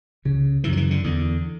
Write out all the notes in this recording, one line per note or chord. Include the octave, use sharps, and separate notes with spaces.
C#2 C#3
F#2 C#3 E3
F#3
E3
D3
E2 D3